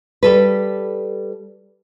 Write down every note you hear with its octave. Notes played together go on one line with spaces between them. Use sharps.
G3 A4 B4